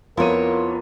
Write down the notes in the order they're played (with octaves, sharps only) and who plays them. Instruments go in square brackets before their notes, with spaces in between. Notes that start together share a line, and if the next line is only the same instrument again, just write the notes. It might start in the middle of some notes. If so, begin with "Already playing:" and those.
[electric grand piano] F2 B3 D#7 [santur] A#3 F4 [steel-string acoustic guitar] E4 C#5 [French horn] A#4